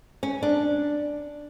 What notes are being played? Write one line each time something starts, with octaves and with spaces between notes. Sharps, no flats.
C#4
D4